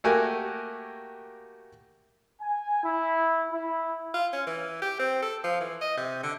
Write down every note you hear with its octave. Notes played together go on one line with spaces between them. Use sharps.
A3 A#3 F#4 G4 A#4 G#5
G#5
E4
E4
F4
C#4
E3
G4
C4
A4
F3
E3
D#5
C3
D3